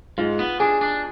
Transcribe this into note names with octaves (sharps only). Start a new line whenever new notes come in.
G#2 F4
B3
D4 G#4
D4